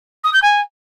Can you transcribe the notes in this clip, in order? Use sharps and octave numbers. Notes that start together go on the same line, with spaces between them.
D#6
G6
G#5